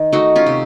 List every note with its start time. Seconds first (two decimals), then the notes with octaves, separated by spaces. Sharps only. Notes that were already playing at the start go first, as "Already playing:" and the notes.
Already playing: D#3 D#5
0.12 A3 D#4 F#4
0.36 C#4 F4
0.46 C3